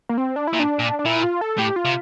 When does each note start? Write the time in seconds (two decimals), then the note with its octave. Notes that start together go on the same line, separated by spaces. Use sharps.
0.09 A#3
0.18 C4
0.36 D4
0.47 E4
0.53 A#2
0.60 D4
0.79 A#2
0.99 D4
1.06 A#2 E4
1.23 F4
1.41 A4
1.58 A2 G4
1.76 F4
1.85 C3